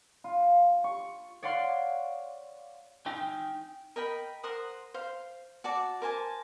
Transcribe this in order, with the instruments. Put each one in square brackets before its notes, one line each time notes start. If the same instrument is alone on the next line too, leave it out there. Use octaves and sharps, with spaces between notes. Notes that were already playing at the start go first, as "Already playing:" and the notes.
[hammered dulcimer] F4
C#6
[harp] C#5 D5 F5 F#5 C6
[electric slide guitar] D#4 G5 G#5
[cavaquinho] A#4 D#5 G5 B5
A#4 C5 F#5 D#6
C5 F5
F#4 D5 A5 D6
A#4 C5 G#5 A5